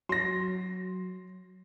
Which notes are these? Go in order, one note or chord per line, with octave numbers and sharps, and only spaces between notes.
F#3 C6 A#6